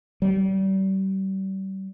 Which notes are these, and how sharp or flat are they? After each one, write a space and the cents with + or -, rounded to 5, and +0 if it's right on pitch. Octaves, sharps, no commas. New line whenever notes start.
G3 -35